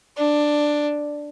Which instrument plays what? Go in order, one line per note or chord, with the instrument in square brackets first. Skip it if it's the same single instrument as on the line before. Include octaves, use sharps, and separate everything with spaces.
[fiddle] D4